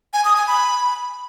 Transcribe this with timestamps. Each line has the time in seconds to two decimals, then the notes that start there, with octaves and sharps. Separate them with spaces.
0.13 G#5
0.25 D#6
0.36 G#5
0.47 B5